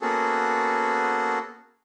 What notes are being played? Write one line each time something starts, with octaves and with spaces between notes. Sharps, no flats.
A#3 B3 C#4 F#4 G#4 A4